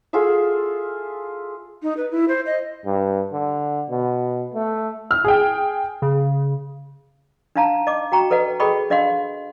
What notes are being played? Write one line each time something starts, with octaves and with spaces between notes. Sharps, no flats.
F4 G#4 A4 E5
D#4
B4
E4
C5
D#5
G2
D3
B2
A3
F6
G#4 G5
C#3
D4 D#4 F5 A5 A#5
D#5 D6
F#4 G5 A#5 C#6
A4 B4 D#5 F#5
G#4 A4 D#5 G5 B5 C#6
D4 D#5 F5 F#5 C6